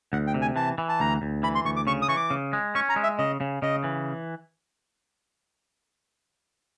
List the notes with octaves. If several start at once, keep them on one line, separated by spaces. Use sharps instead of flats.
D2 F#5
G5
C3
G#5
E3 A5
E3
A5
D2 A#5
D2
E3 B5
C6
D2 C#6
D6
C#3 C#6
D#6
E3 C#6
D6
C#3
G#3
C#4 C#6
A#5
G#3
E5
C#3 D#5
C#3
C#3 D#5
E3